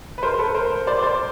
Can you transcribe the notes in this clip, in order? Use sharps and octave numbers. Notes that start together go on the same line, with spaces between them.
B4
A#4 C5
A4 B4
A#4 C5
C5 D5
C5 D5